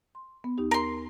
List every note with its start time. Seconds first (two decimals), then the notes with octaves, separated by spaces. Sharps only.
0.15 C6
0.44 B3
0.58 D#2 D#4 G4
0.71 A#4 C6